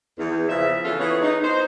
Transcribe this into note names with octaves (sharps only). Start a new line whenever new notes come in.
E2
C#3 F3 E5
E3 C#4 F4 A4
E3 B3 G#4 C#5
D#4
D#4 C5